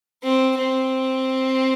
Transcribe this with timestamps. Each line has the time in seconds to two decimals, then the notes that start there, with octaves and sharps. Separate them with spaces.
0.23 C4
0.58 C4